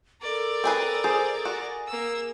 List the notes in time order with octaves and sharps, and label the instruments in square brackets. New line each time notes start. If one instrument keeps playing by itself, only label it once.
[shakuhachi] A4 [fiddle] A#4 D5
[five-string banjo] C4 G#4 B4
[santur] G#4 [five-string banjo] C5
[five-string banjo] F#4
[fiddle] A#3 E6